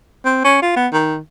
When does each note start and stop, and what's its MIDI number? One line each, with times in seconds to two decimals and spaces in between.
0.25 0.44 60
0.44 0.58 61
0.62 0.74 65
0.76 0.87 59
0.92 1.17 51